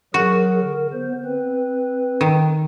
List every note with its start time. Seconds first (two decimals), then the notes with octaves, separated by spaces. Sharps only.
0.14 F#3 F#4 G#4 A#4
0.61 D3 A#4
0.93 B3 C5
1.25 C4 B4
2.21 D#3